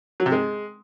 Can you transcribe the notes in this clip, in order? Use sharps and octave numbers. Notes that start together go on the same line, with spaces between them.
F#3
C3
G#3